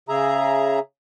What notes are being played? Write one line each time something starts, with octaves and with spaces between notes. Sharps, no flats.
C#3 G#4 E5 A#5